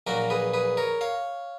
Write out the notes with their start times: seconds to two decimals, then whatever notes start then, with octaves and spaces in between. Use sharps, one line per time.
0.07 A#1 A#2 F#3 A#3 F#4 A#4
0.30 G#4 B4
0.54 G#4 B4
0.77 A#4 C#5
1.01 C#5 F5